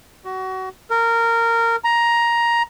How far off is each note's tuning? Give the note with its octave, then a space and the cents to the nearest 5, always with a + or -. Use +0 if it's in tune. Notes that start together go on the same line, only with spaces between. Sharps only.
F#4 +25
A#4 -15
A#5 +10